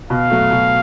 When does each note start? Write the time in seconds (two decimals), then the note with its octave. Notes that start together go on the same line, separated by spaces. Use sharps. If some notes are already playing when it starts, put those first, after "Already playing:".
0.10 B2 F5
0.30 F#3 A3
0.51 B2